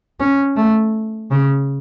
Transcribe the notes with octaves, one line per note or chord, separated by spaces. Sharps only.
C#4
A3
C#3